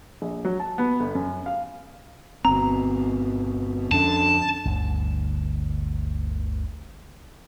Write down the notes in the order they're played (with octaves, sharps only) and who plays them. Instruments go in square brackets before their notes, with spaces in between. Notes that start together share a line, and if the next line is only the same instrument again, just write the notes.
[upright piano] A#1
F#3
A5
B3
G1
F#2
F5
[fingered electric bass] G1 C4 [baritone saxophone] B2 [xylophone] A#5
[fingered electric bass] F2 C#4 [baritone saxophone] D3 [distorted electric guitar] A5
[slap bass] G1 D2 G2